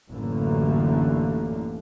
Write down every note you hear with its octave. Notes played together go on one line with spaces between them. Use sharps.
A1 F#2 D3 E3 A#3